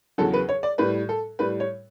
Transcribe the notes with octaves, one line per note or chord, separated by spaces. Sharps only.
E2 C#3 F#3 A4
B4
C#5
D5
A2 G3 B4
A4
A2 G3 B4
C#5